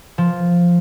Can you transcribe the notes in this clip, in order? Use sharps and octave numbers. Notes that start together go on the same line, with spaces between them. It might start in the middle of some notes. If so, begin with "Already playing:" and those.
F3